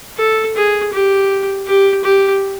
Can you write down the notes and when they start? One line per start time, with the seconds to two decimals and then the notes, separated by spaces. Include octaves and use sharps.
0.18 A4
0.56 G#4
0.93 G4
1.67 G4
2.04 G4